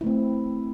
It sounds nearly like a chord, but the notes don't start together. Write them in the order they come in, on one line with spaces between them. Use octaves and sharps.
E4 A3 C4